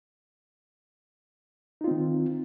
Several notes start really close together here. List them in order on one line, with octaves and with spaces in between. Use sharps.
D#4 F4 C4 D#3